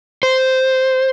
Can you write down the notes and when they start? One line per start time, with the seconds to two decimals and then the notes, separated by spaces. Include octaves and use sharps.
0.23 C5